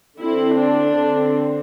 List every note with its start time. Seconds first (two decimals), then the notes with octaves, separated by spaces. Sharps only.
0.19 D3 C4 E4
0.57 D4
0.95 D3 C4